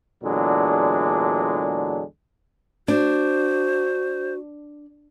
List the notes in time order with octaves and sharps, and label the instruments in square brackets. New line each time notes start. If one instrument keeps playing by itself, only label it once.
[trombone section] E2 A#2 D3 F#3 G#3 D4
[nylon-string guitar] D4 [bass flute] F#4 [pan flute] C5